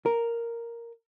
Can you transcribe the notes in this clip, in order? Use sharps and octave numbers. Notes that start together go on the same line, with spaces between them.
A#4